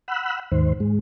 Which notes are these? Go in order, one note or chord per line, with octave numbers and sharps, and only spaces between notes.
F#5 B5 E6 F#6
D#2 G#2 D#3 C5
G#2 G#3